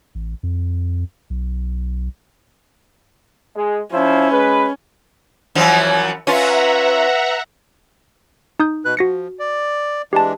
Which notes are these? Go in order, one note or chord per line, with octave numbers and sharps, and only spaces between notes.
A1
F2
B1
G#3
F3 C#4 E4 C5
G#3 B4
F#2 E3 F3
C#4 F4 B4 E5 F#5 A#5
D#4 D#6 G6
B2 B4 F#6
F3 F#4 A#6 C#7
D5
E3 G#3 D4 G4 A5